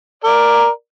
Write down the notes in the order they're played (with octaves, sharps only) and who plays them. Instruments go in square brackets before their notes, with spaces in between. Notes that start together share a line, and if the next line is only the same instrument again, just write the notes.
[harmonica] A#4 D5